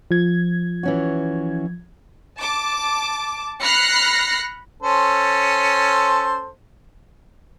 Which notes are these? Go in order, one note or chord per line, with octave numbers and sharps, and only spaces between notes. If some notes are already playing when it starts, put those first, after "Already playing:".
F3 G#6
E3 C#4 F#4
A5 D6
B5 F6 F#6 A#6 C7 C#7
C#4 A4 C5